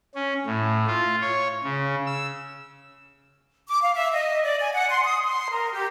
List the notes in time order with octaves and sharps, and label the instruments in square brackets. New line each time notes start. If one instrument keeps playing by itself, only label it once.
[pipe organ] C#4
A2
F4
C#5
C#3
E6
[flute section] D6
F5
E5
D#5
D5
G#5
F#5
C6
D#6
C6
A#4
G4